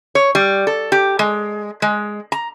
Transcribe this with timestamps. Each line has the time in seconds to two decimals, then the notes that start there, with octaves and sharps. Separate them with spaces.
0.15 C#5
0.35 G3
0.67 A4
0.92 G4
1.19 G#3
1.82 G#3
2.32 A#5